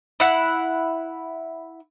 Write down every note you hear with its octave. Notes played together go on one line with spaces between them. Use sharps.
E4 F#5